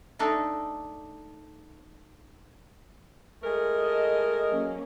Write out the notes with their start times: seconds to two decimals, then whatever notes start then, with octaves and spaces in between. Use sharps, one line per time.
0.19 A3 D4 D#4 A4
3.42 G#3 A3 A#4
3.76 D#5 A5
4.49 F#3 A#3 C#4